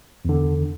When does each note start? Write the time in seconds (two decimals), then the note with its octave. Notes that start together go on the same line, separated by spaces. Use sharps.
0.25 E2 D3